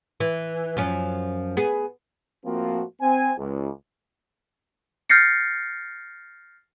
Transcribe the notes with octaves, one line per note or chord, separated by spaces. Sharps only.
E3
F#2 F3 C#4
B3 G#4
A2 F3 A#3 C4 F4 F#4
C4 G#5
C#2
F6 G6 A6 A#6 C7 C#7